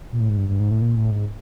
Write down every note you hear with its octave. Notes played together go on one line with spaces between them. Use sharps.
A#2
A2
G#2
G2
G2
G#2
A2
A#2
A2
G#2